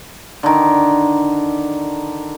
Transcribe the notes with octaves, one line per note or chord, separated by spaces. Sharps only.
D3 D#3